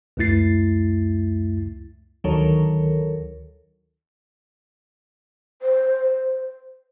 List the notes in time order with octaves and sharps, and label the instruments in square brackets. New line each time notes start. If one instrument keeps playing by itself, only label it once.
[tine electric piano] C#2 F#2 A3 E4 A6 C7
[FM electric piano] D2 D#3 F#3 A4 A#4 C#5
[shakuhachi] C5